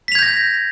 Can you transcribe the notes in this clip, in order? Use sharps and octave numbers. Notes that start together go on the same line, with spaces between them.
G6 G#6 A#6 B6 F7